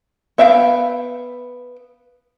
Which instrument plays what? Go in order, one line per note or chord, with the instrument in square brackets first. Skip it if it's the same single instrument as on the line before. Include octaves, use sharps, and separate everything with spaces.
[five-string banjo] B3 E5 F5 G5